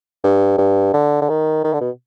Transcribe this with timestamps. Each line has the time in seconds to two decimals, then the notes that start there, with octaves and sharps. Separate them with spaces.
0.24 G2
0.58 G2
0.93 D3
1.21 D3
1.29 D#3
1.64 D#3
1.73 D3
1.81 B2